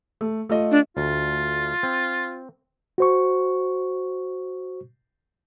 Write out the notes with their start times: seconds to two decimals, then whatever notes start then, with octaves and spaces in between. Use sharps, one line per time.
0.21 A3
0.49 A3 F4 D#5
0.71 D4
0.97 D2 F4
1.83 C4
2.98 F#4 C5 C#6